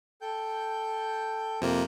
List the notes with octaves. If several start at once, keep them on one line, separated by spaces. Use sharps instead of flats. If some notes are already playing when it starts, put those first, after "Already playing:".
A4 G5 G6
F2 C3 A#3